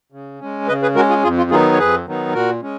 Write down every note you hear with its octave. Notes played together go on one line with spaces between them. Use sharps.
C#3
G#3 C#4
C#3 B4 D#5
G#4 B4
G#3 C#4 F#4 A#4
F4 G#4
F2 F4 G#4
F4
D#3 F#3 B3 D#4 F4 G#4
C#5
F2 G#4 B4
D#3 F#3 B3 D#4
A#2 F#4 A#4
G#3 C#4